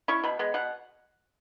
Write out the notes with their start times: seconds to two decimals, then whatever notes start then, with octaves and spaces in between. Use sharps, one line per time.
0.08 C#4 E4 C#6
0.24 B2 B5
0.39 G#3 B3
0.54 B2 F#5